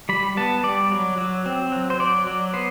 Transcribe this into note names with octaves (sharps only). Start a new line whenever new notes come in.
G3 B5
B3 A5
G3 D5
F#3
F#3
C4
F#3
C5
F#3 D5
F#3
B3 C5